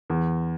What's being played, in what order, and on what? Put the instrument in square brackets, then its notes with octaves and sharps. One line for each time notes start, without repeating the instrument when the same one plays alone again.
[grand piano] E2